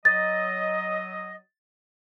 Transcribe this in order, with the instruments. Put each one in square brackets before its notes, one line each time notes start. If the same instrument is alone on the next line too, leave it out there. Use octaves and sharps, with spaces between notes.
[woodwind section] F#3 D#5 [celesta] A6